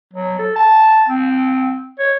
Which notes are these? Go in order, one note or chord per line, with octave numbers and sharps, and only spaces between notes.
F#3
A4
A5
C4
C#5